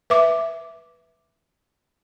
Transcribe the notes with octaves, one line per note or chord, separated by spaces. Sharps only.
B4 E5 D6